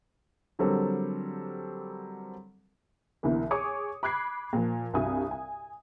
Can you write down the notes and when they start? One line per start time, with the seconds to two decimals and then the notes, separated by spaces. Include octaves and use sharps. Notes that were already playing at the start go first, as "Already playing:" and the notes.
0.59 D3 F#3 G3 C4 A4 A#4
3.23 C2 B2 D3 E3 A#3
3.51 G#4 C#5 D6 D#6 C#7
4.03 B5 D6 F#6 G#6 C7
4.53 A#2 F3
4.93 C2 G2 C3 F#4 G#5 D#6
5.31 G#5